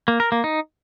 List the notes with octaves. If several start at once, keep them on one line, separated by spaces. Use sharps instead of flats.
A#3
A#4
A#3
D#4